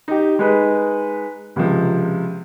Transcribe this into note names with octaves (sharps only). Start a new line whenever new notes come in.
D#4 G4
G#3 D#4 B4
C#2 C3 F3